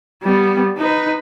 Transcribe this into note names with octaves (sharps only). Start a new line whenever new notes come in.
G3 B3
D#4 B4